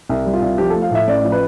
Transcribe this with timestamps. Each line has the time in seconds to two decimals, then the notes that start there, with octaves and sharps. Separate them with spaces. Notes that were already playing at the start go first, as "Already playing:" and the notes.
0.09 C2
0.26 G3
0.33 F4
0.42 C2
0.58 F3 G4
0.70 A3 A4
0.82 F5
0.91 A2 E5
1.07 A1 D5
1.25 F3
1.32 B4